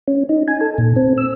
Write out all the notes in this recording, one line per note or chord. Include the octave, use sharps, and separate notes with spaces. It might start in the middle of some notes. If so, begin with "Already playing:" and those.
C#4
D#4
G#5
A4
A#2
C4
E6